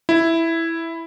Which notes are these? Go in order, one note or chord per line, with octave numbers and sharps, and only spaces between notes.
E4